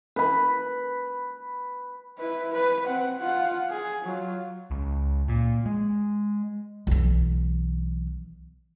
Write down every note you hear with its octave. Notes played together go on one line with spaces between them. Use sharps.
B4 B5
E4 B4
B4
C4 F#5
F4 F#5
G#4
F#3 F4
C#2
A#2
G#3
B1 E3